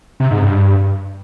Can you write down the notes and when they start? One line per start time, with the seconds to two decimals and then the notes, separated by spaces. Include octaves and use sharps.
0.20 C3
0.31 G#2
0.42 G2